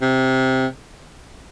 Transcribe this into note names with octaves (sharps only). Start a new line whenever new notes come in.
C3